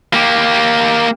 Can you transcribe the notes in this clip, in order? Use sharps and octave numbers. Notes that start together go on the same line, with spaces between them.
A#3 G4